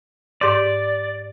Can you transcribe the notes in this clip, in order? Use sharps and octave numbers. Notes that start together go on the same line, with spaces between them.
G#2 G4 D5 C6